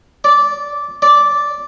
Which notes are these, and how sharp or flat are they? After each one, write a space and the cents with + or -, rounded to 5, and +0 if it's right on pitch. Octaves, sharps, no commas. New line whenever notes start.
D5 -10
D5 -5